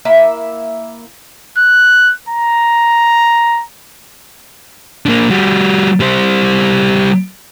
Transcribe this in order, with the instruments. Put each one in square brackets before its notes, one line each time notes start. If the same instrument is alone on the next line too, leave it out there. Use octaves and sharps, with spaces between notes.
[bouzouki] A#3 E4 E5
[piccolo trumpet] F#6
A#5
[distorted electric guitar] A#3 D4
G3 F#4
G3 C5